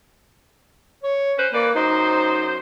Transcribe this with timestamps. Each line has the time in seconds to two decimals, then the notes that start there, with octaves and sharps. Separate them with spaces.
1.03 C#5
1.38 C#4 B4 C5
1.53 E3 A#3 B4 D5
1.75 F#2 D#4 C5